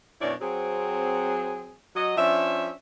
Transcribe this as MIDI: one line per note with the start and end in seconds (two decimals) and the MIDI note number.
0.21 0.34 42
0.21 0.34 47
0.21 0.34 62
0.21 0.34 64
0.21 0.34 73
0.21 0.34 74
0.41 1.75 54
0.41 1.75 60
0.41 1.75 68
1.96 2.16 54
1.96 2.16 75
2.17 2.71 53
2.17 2.71 61
2.17 2.71 62
2.17 2.71 76